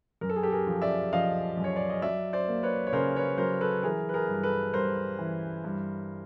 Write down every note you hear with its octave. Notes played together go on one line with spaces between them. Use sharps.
F#2 A#4
A4
G#4
G4 A4
G#4 A#4
F3
D5 E5
F3 D#5 F5
F#2
C#5
D5
D#5
F#3 D5 E5
C5 D5
A#3
B4 C#5
C#5
C#3 A#4 C5
B4 C#5
F#3 A#4 C5
A4 B4
E3 G#4 A#4
B4
G#4 A#4
G2
A4 B4
G2 A#4 C5
E3
G2